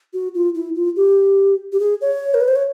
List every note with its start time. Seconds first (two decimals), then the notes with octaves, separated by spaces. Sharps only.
0.13 F#4
0.34 F4
0.55 E4
0.75 F4
0.96 G4
1.72 G4
1.80 G#4
2.01 C#5
2.34 A#4
2.41 B4
2.48 C5
2.56 C#5